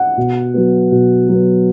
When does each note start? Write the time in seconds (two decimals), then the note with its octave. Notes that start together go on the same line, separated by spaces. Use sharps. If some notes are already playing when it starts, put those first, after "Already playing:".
Already playing: F#5
0.17 B2
0.54 F#3 B3
0.91 B2
1.29 F#3 B3